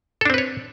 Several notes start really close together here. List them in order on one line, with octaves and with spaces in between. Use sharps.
A4 D4 C4 B4 C#5